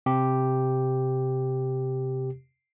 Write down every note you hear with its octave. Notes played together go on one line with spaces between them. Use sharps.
C3 G4